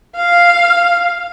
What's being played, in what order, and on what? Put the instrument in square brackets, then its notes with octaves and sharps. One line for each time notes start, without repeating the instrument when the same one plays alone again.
[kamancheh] F5